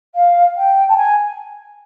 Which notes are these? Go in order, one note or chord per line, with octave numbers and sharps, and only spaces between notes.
F5
G5
A5
G#5